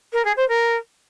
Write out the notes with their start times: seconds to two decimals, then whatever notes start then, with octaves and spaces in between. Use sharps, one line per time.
0.13 A#4
0.25 G#4
0.37 C5
0.49 A#4